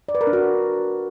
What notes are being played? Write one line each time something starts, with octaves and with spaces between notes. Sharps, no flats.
D5
B4
A#4
D4
F#4